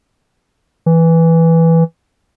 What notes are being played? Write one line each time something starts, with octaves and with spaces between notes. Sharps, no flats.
E3